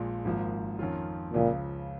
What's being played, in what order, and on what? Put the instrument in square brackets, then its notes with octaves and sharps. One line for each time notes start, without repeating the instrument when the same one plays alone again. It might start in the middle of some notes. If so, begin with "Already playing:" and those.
Already playing: [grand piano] A#1 A#2 G#3
G#1 G#2 F3 A#3
F2 D#3 C#4 F4
[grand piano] C#2 C#3 F3 [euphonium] A#2